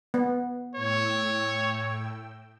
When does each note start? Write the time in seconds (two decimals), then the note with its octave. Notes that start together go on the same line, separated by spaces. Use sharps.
0.14 B3
0.75 A2 C#5 G5 E6